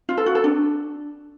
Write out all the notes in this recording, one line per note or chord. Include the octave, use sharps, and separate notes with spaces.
F4
A4
F#4
A4
D4